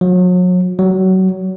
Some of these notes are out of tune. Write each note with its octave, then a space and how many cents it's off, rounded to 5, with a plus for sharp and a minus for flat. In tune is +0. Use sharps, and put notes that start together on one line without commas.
F#3 -35
F#3 +25